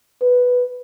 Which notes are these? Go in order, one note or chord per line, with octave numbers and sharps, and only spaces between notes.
B4